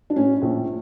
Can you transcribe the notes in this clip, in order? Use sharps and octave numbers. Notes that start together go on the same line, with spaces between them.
D4
A2 C#4
A#1